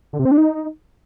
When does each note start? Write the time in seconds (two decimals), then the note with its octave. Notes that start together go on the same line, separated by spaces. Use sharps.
0.13 D3
0.19 C3
0.25 C4
0.31 D4
0.38 D#4